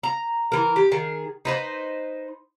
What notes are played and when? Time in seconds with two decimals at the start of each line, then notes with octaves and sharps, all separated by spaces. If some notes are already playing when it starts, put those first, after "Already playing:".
0.03 A#5
0.52 E3 A#4
0.76 G4
0.91 D#3 G#4
1.45 D#4 B4 C5